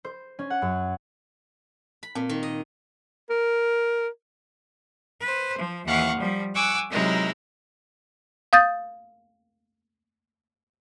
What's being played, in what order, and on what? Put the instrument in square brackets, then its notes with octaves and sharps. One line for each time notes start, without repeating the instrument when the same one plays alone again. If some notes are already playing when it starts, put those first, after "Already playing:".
[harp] C5
C#4
F#5
F#2
[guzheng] B5
[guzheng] A#2 [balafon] C4
[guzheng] D#3
D#5
[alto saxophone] A#4
[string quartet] B4 C5
F3
D#2 E3 F5 F#5 C#6
F3 G3
F#5 G#5 C#6 D6 E6 F#6
C3 F#3 G#3 D#4 E4 A#4
[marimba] F5 D#6 G6 A6